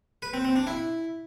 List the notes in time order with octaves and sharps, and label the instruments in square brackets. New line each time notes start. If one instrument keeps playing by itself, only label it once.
[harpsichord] B4
C4
C4
D4
E4